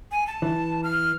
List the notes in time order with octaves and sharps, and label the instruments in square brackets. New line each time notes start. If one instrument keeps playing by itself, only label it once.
[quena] G#5
A5
[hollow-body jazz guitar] E3
[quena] F6